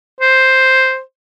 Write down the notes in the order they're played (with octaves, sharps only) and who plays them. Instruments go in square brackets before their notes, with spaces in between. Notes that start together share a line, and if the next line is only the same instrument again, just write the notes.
[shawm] C5